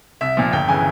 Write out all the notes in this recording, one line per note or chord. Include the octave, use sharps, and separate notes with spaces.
C2 E5
A#2 F3
G1 G5
C#3 E3 G#5